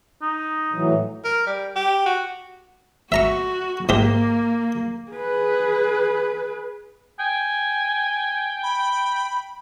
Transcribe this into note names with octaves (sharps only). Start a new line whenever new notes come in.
D#4
A2 E3 F#3
A#4
G3
G4
F#4
F#4 E5 A#5 C#6
G#2 G#3 A#3 G4
G#4 B4
G5 G#5
B5